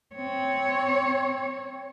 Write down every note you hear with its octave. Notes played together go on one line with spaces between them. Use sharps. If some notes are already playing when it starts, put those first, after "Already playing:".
C4 C#5